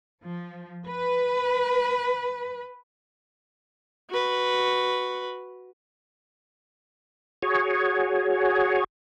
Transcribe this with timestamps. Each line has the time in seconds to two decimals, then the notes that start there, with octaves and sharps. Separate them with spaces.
0.23 F3
0.87 B4
4.10 F#4 B4
7.43 F#4 G#4 C#5